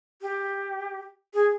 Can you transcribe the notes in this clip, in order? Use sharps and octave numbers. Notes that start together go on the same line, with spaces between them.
G4
G#4